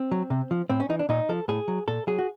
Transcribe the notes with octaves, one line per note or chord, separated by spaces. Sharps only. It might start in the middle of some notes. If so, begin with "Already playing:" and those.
Already playing: C4
F#3
C3
F3
A2 C4
C#4
E3 D#4
D4
A#2 D#4
F3 A4
A2 G#4
F#3
A#2 A4
F#3 G#4
F#4